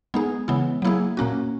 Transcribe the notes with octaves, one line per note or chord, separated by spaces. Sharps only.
G#3 B3 D#4 G#4
C#3 E3 G#3 B3 E4
F#3 A#3 E4 G#4
A#2 A#3 C#4 F#4